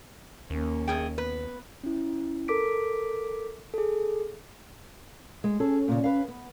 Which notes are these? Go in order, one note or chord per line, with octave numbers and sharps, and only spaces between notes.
D#2 A#3 C#4
F#2 G#4 G5
B3 B4
C#4 E4
A4 A#4 D6 B6 D7
G#4 A4
G#3
C#4 G#4 A4
A#2 C#3
B4 F5
B3